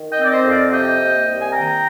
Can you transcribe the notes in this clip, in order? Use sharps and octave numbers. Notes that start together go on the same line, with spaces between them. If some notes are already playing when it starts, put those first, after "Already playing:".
Already playing: D#3
D#5 G5
C4
D5
C5 D#5
F2
D5 F5
C3 D#5 G5
A#3
C2
G#5
D#3 G5 A#5